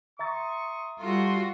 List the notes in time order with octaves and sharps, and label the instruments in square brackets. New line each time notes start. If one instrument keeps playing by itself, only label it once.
[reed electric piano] E5 A#5 A6 [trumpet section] C6 C#6 D#6
[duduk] G3 [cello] F4 F#4 [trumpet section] A4 C6